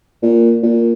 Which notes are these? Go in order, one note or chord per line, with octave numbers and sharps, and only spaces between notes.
A#2
A#2